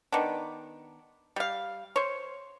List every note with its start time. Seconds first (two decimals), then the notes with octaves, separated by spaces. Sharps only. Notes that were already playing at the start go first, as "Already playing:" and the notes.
0.12 D#3 B3 D4
1.36 G3 F5
1.96 C5 C#5